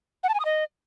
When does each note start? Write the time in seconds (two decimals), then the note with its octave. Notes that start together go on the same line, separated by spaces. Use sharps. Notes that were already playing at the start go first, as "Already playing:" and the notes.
0.23 F#5
0.29 A5
0.34 G#5
0.40 D#6
0.45 D#5